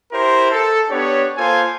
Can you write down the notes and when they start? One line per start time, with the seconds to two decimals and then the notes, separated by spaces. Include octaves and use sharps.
0.13 E4 G4 A#4 C5
0.51 A4
0.90 B3 D4 G4 C#5
1.38 A#3 F4 A4 C5 G#5